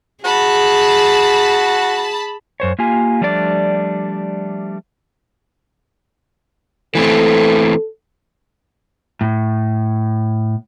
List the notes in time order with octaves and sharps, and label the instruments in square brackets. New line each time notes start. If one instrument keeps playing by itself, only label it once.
[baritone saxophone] F#4 [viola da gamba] G#4 [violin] A5 B5
[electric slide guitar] F#2 C5 C#5
A#3 F4 G4 G#5
F3 G3 A3 D4 D5
[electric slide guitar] E3 A3 C4 [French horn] A4
[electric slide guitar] A2